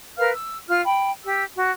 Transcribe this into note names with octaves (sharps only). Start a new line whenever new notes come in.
A#4 B4 F5 F6
E6
F4 F6
G5 B5
G4 E6
F#4